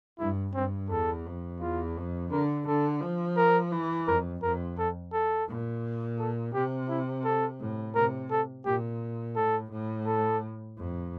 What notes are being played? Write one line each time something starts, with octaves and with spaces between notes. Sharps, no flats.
G2 E4
G2 C4
E2 A4
F2
E2 F4
F2
D3 A#4
D3 A4
F3
A#4
E3
F2 A#4
F2 A#4
A4
A4
A#2
A4
C3 G4
E4
A4
A2
C3 A#4
A4
A#2 G4
A2 A4
A2
A4
F2